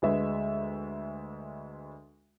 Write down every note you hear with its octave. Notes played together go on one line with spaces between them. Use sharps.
D2 G#3 B4 E5